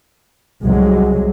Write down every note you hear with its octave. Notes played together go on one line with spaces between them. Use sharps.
C2 F#3 G#3